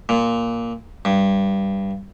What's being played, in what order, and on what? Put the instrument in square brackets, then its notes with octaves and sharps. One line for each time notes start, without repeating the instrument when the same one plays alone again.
[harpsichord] A#2
G2